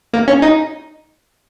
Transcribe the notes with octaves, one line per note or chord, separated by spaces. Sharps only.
A#3
C#4
D#4